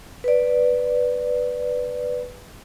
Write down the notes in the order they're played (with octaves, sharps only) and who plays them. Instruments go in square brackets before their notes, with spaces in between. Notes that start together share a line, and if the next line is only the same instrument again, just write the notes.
[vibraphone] B4 D5